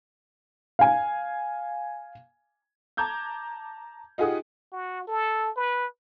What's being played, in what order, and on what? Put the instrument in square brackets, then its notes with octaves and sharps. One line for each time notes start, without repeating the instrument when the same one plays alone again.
[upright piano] F5 G#5
[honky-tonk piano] A5 A#5 D6 G6 G#6
D#4 F4 G4 G#4 F#5 D#6
[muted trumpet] F#4
A4
B4